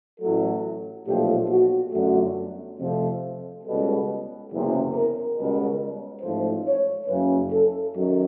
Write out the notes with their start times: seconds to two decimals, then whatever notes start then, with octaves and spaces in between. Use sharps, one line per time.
0.21 A1 A2 F#3 A3 A4
1.06 B1 A#2 F3 A3 G4
1.50 F#4
1.92 G1 F#2 D3 F#3 A3 F#4
2.78 F2 C3 F3 A3 G4
3.64 C#2 B2 G3 A4
4.50 F#1 E2 C3
4.94 A#4
5.36 C#2 B2 G3 A#4
6.22 A1 G#2 F3 A3 C5
6.66 C#5
7.07 F#1 F#2 C#3 B4
7.51 A4
7.94 F#2 D#3 F#3